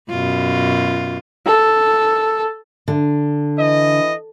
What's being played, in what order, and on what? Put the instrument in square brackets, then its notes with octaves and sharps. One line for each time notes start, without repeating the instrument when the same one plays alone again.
[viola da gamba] F#2 B2 F4
[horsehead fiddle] A4
[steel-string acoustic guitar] D3
[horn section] E3 D#5